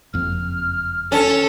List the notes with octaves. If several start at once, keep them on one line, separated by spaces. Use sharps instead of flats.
F#1 F2 F3 F6
C#4 A4 A5